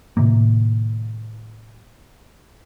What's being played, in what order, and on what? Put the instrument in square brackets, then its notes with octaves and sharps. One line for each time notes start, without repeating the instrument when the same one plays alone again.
[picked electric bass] A2 C3 D#3 A#3